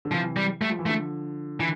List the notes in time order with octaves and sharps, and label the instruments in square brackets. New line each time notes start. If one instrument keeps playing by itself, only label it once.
[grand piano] D3
[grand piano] C3 E3 [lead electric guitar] F3
[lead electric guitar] G3
[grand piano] G3 [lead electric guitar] A3
[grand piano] F3
E3
[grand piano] D3 F3 [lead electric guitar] A3
[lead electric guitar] E3